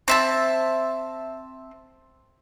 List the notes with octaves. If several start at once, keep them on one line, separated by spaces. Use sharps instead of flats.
C4 E5 A5